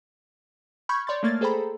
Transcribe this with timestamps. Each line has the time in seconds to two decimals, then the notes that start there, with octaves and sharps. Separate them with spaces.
0.89 B5 C#6 F6 G6 G#6
1.07 C#5 D5 C6 G6 A6
1.23 A3 A#3 F6 G#6 A6
1.41 G#4 A4 C5 G5 A#5 B5